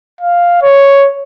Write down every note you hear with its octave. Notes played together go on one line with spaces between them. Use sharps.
F5
C#5